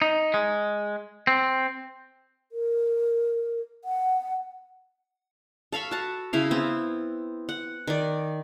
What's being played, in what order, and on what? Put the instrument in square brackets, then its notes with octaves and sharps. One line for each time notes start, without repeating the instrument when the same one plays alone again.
[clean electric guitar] D#4
G#3
C4
[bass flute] A#4
F#5
[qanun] A4 F5 B5 C#6
F#4 A5
C#3 E4 F5
B3 C4
F#5
D#3 D5